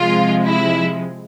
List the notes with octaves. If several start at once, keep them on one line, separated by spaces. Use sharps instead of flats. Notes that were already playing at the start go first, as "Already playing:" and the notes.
Already playing: C3 F3 G#3 F4
E4